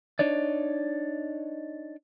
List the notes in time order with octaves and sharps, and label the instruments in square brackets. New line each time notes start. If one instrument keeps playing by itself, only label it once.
[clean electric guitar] D4 D#4 C#5 D5